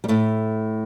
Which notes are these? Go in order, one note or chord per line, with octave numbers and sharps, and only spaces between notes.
G3
A2 A3